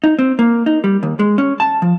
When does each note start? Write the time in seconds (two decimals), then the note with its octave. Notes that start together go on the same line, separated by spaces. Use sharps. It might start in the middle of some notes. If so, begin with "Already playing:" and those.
0.04 D#4
0.19 C4
0.39 A#3
0.66 D#4
0.84 G3
1.03 D#2
1.19 G#3
1.38 C#4
1.60 A5
1.82 F3